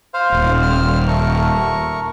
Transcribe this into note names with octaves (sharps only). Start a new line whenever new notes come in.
C5 F5
D#1
C5 F6
A3 A#4 C#6